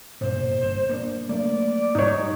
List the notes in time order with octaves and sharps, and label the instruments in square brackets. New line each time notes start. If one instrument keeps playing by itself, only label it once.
[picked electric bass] B1 G2 A#2 [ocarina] C5
[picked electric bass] G1
A#3 C4 D4
[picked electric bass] F#3 A3 A#3 [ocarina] D5
[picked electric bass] G#2 G3 [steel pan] D#4 C#5